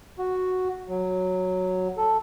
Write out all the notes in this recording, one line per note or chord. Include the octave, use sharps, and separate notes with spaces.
F#4
F#3
A4